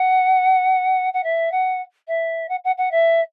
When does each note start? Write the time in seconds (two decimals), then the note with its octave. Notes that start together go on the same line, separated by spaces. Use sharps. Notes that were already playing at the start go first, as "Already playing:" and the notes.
Already playing: F#5
1.13 F#5
1.23 E5
1.51 F#5
2.08 E5
2.49 F#5
2.64 F#5
2.78 F#5
2.91 E5